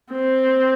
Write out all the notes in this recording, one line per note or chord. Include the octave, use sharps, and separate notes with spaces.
C4